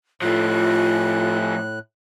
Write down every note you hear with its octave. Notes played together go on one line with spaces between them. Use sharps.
A2 F3 A3 F4 F#6